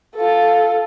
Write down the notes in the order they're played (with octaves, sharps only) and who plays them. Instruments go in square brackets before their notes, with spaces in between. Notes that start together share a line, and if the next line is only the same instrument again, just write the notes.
[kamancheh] F4 A4